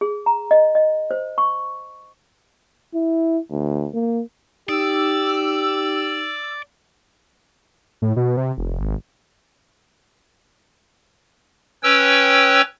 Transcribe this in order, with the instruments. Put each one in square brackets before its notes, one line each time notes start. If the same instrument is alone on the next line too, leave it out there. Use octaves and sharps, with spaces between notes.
[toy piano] G#4
A#5
D#5
D#5
C5
C#6
[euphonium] E4
D2
A#3
[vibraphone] D#4 [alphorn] G4 [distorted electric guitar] D5 [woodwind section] E6
[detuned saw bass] A2
B2
C3
F1
G#1
[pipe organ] C#4 B4 C#5 G5 E6